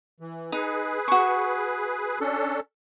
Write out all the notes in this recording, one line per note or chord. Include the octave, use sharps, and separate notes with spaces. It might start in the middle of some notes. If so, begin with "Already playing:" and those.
E3
D#4 G#4 B4
F#4 C#6
C#4 D4 A4